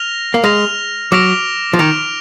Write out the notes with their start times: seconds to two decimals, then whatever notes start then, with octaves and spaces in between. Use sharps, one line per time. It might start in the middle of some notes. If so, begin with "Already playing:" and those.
Already playing: F6 A#6 F7
0.34 A#3
0.44 G#3 F6 A#6 F7
1.12 F#3 D6 F6 A#6 D7 F7
1.73 F3
1.79 D#3 D6 F6 A#6 D7 F7